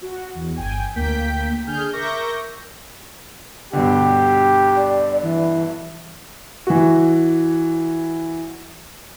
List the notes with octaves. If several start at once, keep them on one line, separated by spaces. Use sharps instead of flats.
F#4
E2
G1 G5 G#5
D2 A#3 G5 G6 B6
D3 G#4 F6 G6
A#4 E5 C#6 D6 G6 A#6
G2 B2 D3 G4
D5
E3
E3 F#4